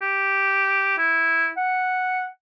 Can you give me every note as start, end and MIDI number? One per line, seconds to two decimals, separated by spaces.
0.02 0.97 67
0.98 1.50 64
1.57 2.27 78